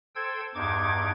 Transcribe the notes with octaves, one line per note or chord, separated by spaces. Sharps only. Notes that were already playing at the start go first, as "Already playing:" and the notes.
A4 C5 G5 E6 G#6
E2 G2 D#4 D6 G#6